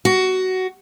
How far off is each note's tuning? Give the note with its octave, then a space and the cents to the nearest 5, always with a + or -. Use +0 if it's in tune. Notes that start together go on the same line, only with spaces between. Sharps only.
F#4 +15